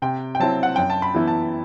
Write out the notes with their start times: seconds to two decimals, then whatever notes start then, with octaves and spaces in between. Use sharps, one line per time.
0.02 C3 G5
0.35 G5
0.40 F#3 C4 E4 A5
0.63 F#5
0.76 F#2 G5
0.90 A5
1.02 B5
1.14 E3 B3 E4
1.27 A5